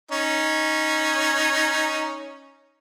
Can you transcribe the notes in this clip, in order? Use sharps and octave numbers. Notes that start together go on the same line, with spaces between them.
C#4 D#4